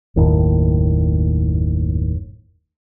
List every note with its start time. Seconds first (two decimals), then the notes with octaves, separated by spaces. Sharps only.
0.16 F#1 D#2 A2 D#3